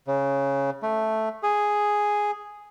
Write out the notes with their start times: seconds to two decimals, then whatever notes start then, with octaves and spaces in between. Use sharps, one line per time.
0.07 C#3
0.83 A3
1.43 G#4